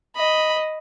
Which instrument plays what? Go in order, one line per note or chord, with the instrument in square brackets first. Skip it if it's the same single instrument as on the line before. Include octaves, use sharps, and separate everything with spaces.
[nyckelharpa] D#5 [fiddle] B5